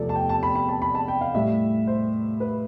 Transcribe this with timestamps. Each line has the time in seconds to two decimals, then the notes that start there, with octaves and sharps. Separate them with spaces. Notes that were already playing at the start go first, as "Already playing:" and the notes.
Already playing: E2 C3 F3 A3 A4 D5
0.09 A5
0.16 G5
0.29 A5
0.43 B5
0.55 B5
0.69 A5
0.82 B5
0.95 A5
1.08 G5
1.21 F5
1.34 A2 G3 E5
1.87 C5
2.40 B4